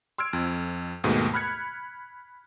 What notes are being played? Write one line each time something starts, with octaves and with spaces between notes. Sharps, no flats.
C6 E6 F6 G#6 D7
F2
D#2 G#2 B2 A3
B5 F6 F#6 G#6 C#7